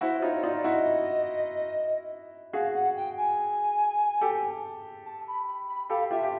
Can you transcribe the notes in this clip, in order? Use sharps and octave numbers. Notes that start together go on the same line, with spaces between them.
E4 F#4 C5
D#4 F4 C#5
C#5
D#4 F4 D5
D5
E4 F#4 D#5
F#4 G#4 F5
F#5
G5
G#5
G4 A4
A5
B5
B5
B5
G4 A4 F5
F4 G4 E5
G4